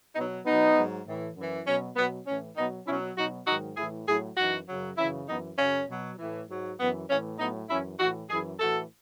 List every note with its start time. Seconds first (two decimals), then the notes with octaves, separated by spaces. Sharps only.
0.15 B2 B3 D#4
0.20 F#3
0.45 B2 B3 D#4
0.51 F#3
0.76 G#2 F#3
1.07 A2 E3
1.36 F#2 E3
1.67 B2 F#3 C#4
1.97 B2 F#3 B3
2.27 A2 E3 C#4
2.57 B2 F#3 B3 D#4
2.87 B2 C#4 E4
2.92 F#3
3.17 B2 F#3 D#4 F#4
3.47 G#2 D#3 F#3 D#4 F#4
3.77 A2 E3 E4 G#4
4.07 A2 F#3 E4 G#4
4.37 F#2 E3 D#4 F#4
4.67 F#2 C#3 F#3
4.97 F#2 C#3 E3 C#4 E4
5.28 F#2 E3 B3 D#4
5.58 F#2 C#3 F#3 C#4
5.88 B2 F#3
6.18 A2 E3
6.49 G#2 F#3
6.79 F#2 E3 B3
7.08 A2 E3 C#4
7.39 A2 F#3 B3 D#4
7.70 F#2 E3 C#4 E4
7.99 A2 E3 D#4 F#4
8.30 F#2 E3 E4 G#4
8.60 A2 E3 F#4 A4